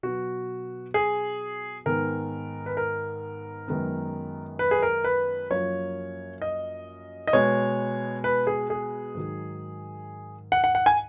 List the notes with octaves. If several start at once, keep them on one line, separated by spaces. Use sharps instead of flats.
B2 F#3 B3 F#4
G#4
G#2 D#3 G#3 B3 A#4
B4
A#4
F#2 D#3 G#3 B3
B4
G#4
A#4
B4
F#2 F3 A#3 C#5
D#5
D#5
B2 G#3 B3 C#5
B4
G#4
G#4
G#2 D#3 F#3
F#5
F#5
F#5
G#5